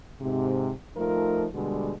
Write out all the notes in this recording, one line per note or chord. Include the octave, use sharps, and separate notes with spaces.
G#2 C3
F3 A3 D#4 F4 A#4
B2 D3 G3 G#3